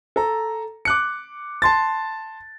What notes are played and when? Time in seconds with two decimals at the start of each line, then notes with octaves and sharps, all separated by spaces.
0.16 A4 A#5
0.85 D6 F#6 C#7
1.62 A5 C6 A6